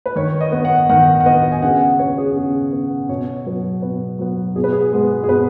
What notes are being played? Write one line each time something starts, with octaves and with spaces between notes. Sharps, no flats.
B4
D#3 C#5
D#5
B3
F#5
D#3 F#5
F#5
B3 D#5
G#5
C#3 F#5
F#5
B3 C#5
G#4
C#3
B3
B2 C#5
F#3 B3
B2 B4
F#3 B3
B2 G#4
B4
G#4
G#3 B3
G#4
B2 B4